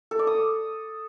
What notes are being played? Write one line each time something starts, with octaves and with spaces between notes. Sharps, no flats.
A4
D5
D#6